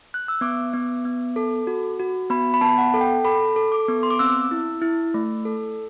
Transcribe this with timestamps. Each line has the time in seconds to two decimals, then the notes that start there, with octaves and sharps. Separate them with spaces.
0.14 F#6
0.28 E6
0.41 B3 D6
0.73 B3
1.05 B3
1.36 A4
1.67 F#4
1.99 F#4
2.30 B3 B5
2.54 B5
2.61 B3 A5
2.69 B5
2.78 F#5
2.94 A4
3.01 G5
3.25 A4 B5
3.56 A4
3.72 D6
3.88 B3
4.03 C6
4.10 D6
4.19 C4 E6
4.51 E4
4.82 E4
5.14 A3
5.45 A4